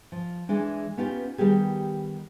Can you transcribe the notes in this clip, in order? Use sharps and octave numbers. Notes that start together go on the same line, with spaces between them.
F3
E3 G#3 D4
B3 C#4 D#4 F4 G4
D#3 G3 B3 G4 G#4